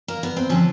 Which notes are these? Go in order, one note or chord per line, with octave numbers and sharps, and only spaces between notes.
A#3
B3
C4
D3 F3 C#4